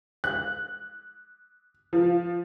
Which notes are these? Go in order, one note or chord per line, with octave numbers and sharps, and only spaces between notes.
F#6
F3